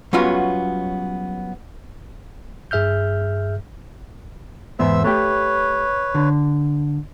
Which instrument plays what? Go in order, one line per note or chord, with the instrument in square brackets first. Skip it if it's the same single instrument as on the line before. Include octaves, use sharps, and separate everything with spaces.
[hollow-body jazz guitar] F#3 G3 B3 C#4 F4 F#4
[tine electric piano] G2 G#4 E5 F6 G6
[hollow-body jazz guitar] E2 G#2 B3 [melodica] C5 E5 E6
[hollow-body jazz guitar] A3 G4 [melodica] B4 C#5
[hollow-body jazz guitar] D3